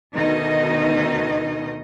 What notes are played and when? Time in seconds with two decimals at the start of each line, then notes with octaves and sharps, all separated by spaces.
0.15 D2 B2 D#3 D#4 D#5